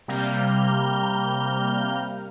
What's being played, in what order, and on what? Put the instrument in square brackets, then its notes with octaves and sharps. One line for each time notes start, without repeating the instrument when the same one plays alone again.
[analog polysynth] C3 G3 A#3 A#5 F6 G6